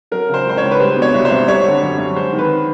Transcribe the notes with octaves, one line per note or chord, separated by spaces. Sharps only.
F#3 A#4
C#3 C5
C#2 C5
C#5
C#2
B4
G3 C5
B2
C#5
C2
C5
C2
G3 C#5
D3
F#2
F#2
G#3 C5
D#3
B4